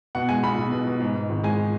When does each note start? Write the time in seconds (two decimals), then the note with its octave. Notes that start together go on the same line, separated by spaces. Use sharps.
0.15 B2 F#5
0.29 G#3 G#5
0.43 B1 B5
0.58 B1
0.72 B2
0.87 B2
1.00 G#2
1.15 G#2
1.30 G#1
1.44 G#3 G#5